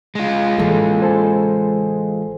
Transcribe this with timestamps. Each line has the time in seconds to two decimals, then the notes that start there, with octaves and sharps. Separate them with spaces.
0.15 G#3 F4
0.57 A1 E3 A#3 G#4 A4
1.00 A4 C5 G#5